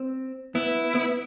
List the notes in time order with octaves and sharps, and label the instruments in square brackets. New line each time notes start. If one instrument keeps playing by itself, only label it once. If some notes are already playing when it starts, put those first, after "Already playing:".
Already playing: [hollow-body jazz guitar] C4
[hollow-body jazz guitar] B3 [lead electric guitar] E4
[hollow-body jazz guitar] B3